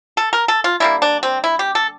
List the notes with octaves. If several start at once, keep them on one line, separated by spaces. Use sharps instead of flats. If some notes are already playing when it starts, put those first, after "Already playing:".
A4
A#4
A4
F4
D3 G3 A#3 E4
D4
C4
E4
G4
A4